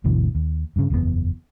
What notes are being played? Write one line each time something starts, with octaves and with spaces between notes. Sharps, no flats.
G1 D2 B2 E3
D#2
G2 C#3
F#1 E2 A#2 B3